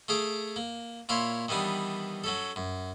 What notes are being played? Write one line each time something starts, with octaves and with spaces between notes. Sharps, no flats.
A3 G#4 F5 D6
A#3
A#2 E4 C#5 F5 C6
D#3 E3 G3 B3 D4
F#3 C#4 A4
F#2